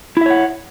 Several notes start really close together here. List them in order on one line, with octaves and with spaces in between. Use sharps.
E4 E5 C#5 F#5